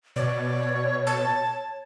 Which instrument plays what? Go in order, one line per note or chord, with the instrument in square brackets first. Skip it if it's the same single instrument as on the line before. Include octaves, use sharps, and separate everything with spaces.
[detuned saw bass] B2 [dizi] C#5 [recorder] D5
[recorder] A5